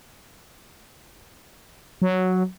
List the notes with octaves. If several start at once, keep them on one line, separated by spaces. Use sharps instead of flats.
F#3